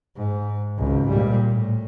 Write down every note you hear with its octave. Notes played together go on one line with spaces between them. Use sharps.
G#2
G#1 C#2
A#2 G3
A2